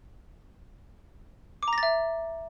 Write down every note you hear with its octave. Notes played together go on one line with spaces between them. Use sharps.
D6
A#5
A#6
A6
E5